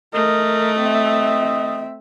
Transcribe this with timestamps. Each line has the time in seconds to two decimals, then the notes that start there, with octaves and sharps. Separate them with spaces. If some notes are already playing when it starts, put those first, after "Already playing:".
0.14 A3 A#4 D#5
0.80 C4 E5